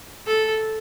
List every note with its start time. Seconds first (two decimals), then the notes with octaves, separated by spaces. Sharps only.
0.27 A4